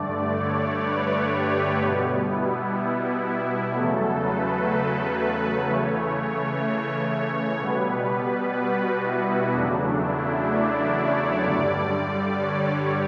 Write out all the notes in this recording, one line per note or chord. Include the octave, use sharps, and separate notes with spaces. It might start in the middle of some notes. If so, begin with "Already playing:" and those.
Already playing: G2 D3 A3 D5
C#5
B4
G4
B2 G3 B3
E4
E4
E2 C#3 F#3 A3 A4
B4
C#3 E3 A3 C#5
C#5
B2 G3 B3 B4
F#4
E4
E2 C#3 F#3 A3 D4
E4
D5
C#5
G2 D3 G3 D5
C#5